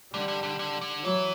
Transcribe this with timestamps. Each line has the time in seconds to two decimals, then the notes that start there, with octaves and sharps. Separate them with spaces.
0.13 D3 G3
0.28 D3
0.43 D3
0.59 D3
0.81 D3
1.04 E3 F#3